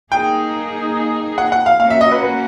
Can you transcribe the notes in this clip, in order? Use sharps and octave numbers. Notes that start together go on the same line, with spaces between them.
A#3 D#4 G#4 G5
F#5
F#5
F5
A#3 C#4 F#4 F5
E5
D#5
B4
B4